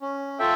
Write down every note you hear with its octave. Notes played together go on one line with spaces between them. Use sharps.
C#4
F4 A4 E5 G5